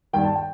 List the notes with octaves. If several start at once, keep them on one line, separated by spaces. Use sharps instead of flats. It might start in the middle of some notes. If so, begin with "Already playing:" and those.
G2 D#3 G5
A5
G5